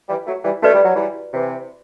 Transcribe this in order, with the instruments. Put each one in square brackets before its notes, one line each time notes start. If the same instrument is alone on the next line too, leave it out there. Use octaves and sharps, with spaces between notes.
[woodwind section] E3 G3
F#3 A3
E3 G3
[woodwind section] A3 [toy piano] F#4 B4 D5
[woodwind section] G3
F#3
E3 G3
C3 E3